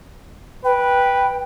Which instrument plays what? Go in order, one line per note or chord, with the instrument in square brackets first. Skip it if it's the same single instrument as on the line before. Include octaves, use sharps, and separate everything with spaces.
[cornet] B4 [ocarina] G5